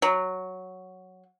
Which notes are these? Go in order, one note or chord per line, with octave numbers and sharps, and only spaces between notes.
F#3